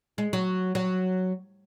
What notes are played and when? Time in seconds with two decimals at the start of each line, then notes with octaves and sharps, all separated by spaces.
0.18 G#3
0.33 F#3
0.75 F#3